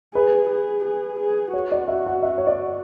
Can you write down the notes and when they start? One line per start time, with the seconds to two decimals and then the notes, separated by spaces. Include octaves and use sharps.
0.15 G#4 B4
0.49 G#4
0.85 G#4
1.20 G#4
1.54 F#4 C#5
1.72 D5
1.88 E5
2.06 F#5
2.23 E5
2.38 C#5
2.47 D5